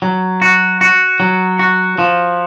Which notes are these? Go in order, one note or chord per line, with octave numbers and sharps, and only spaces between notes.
F#3
F#4
F#4
F#3
F#4
F3